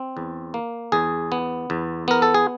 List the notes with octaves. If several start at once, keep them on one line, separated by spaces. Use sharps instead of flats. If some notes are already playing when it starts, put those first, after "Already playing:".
Already playing: C4
E2
A#3
E2 G#4
B3
E2
B3 A#4
A4
G#4